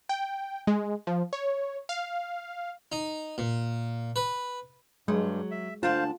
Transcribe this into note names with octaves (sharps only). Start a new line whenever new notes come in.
G5
G#3
F3
C#5
F5
D#4
A#2
B4
G2 F#3 G#3
E5
D2 D4 F4 C5 F5 A5